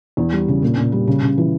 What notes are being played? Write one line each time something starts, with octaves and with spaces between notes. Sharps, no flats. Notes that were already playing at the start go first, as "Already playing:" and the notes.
E2
G3
C#3
A#2
A#2
G3
C#3
C#3
E3